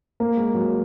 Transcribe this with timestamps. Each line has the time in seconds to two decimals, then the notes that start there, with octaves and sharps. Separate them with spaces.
0.20 A#3
0.37 G#3
0.54 F#3